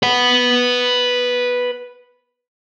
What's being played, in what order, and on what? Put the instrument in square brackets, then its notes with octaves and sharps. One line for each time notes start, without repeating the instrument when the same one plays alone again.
[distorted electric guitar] B4 F#5